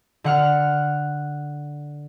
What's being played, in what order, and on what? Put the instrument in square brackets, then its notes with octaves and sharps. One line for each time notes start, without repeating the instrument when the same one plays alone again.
[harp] D3 F#5 F6